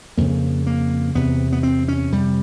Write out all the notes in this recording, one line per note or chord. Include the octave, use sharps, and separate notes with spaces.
F2 C#3 A#3
A#3
E2 C3 B3
B3
C4
C#4
F2 C3 G3